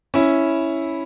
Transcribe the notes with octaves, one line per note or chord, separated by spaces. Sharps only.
C#4 E4